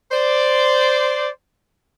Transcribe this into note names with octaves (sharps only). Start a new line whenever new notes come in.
C5 D5